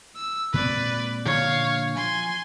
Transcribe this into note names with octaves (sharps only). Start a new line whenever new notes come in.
E6
A#2 G#3 C4 B4 D5
A#2 D3 F3 C#5 F5
F3 G#5 C6